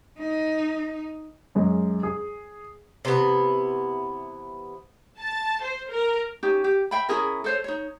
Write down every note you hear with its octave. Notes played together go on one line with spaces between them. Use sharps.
D#4
F#2 G#3
G#4
C3 E3 B3
A5
C5
A#4
C#4 D#4 G4
G4
E5 G5 B5
C#4 E4 G#4 A#4
A4 C5 C#5
D#4 C#5